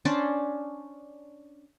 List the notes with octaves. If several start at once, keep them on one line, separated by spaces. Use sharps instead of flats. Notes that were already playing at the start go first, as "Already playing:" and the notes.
C#4 D4 C5 D5